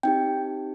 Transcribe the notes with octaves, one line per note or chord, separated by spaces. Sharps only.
C4 D#4 G4 G5